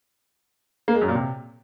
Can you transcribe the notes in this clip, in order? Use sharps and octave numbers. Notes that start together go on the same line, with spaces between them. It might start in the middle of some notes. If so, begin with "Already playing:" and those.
A#3
G#3
F#2
A#2
C3